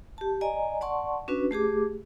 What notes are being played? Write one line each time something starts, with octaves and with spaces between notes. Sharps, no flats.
G4 A5
D5 D#5 G#5 A#5
D5 F#5 A5 C6 C#6
C#4 D4 F#4 B4
A3 G4 G#4 D6